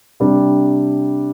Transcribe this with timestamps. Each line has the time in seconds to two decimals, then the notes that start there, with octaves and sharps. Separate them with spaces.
0.20 C3 G3 D4